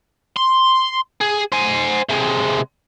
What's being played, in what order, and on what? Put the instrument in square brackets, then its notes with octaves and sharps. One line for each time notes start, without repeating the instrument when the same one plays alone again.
[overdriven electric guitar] C6
G#4
C5 G#5
C3 G#3